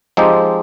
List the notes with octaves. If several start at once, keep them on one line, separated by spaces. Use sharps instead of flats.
F3 G#3 C4 D#4 G4